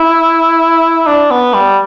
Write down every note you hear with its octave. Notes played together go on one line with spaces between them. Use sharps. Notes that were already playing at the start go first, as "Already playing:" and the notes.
Already playing: E4
D4
B3
G3